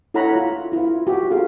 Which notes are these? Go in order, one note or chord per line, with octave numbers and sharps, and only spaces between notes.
E4 A4 C#5 F#5 A#5 B5
F4
E4 F4
F#4 G4
F4 G#4 A4 F5